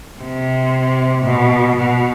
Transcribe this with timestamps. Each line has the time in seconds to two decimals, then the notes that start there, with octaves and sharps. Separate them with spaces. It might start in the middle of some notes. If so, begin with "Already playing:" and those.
0.22 C3
1.25 B2
1.76 B2